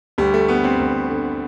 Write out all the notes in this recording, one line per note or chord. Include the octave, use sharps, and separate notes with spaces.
D2 G3
A3
D3 B3
C4
D2
D3